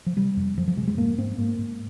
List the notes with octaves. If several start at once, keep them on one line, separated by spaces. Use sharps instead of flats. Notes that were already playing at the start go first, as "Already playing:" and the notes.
F3
C3 G3
F2
F2 F3
F3
C3 G#3
G#3
G#2 A#3
G#2 C4
G#2 A#3
G#2